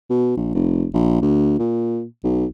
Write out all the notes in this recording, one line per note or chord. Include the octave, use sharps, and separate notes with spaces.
B2
A#1
F1
A#1
D2
A#2
B1